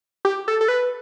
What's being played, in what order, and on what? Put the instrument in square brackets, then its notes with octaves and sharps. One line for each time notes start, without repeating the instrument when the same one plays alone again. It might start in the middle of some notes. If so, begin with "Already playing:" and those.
[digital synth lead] G4
A4
A4
B4